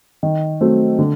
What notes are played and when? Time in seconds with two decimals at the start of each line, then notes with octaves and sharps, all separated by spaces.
0.23 D#3
0.61 F#3 A3 C4
0.99 D3